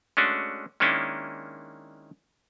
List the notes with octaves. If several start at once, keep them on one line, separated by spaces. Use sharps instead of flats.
G#3 A3 C#4 D4 F#4
D#3 G#3 A#3 C#4 D4 E4